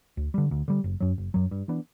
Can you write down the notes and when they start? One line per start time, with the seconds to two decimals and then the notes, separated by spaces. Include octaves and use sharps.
0.17 D2
0.34 D3 G3
0.51 D2
0.68 D3 G3
0.84 F#1
1.00 F#2 F#3
1.18 F#1
1.34 F#2 F#3
1.51 G2
1.68 E3 B3 D4